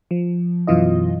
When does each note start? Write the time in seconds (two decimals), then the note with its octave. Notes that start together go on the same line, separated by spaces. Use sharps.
0.11 F3
0.67 F#2 B2 E3 F4 D#5